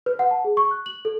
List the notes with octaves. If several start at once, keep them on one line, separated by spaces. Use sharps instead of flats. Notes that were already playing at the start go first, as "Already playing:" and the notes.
B4
F#5
A5
G#4
C#6
F#6
F#7
A4